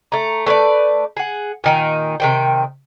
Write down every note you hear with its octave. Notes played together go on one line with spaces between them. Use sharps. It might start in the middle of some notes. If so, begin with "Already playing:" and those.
A3 A#5
A3 B4 C#5 D5
G#4 F#5
A#2 D#3 D#4
C3 D#3 G5